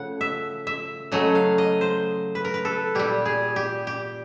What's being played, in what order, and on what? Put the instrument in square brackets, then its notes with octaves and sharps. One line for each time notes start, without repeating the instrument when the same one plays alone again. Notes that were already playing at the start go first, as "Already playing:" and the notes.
Already playing: [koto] C#3 F3 A3 F#5
E5
E5
C#3 F#3 A3 D#5
F5
D#5
C5
B4
A#4
B4
A4
A#2 G3 G4
G#4
G4
G4